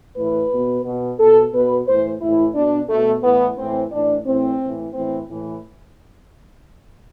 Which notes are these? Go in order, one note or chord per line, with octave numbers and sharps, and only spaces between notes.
A2 E3 B4
B2
B2
B2 A4
B2 B4
A2 E3 C5
A2 E3 E4
B2 D4
B2 A3
A2 E3 B3
A2 E3 C4
A2 E3 D4
A2 E3 C4
A2 E3
A2 E3 C4
A2 E3